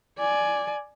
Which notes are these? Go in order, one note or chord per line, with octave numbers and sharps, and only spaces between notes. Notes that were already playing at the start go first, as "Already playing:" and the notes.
D5 G#5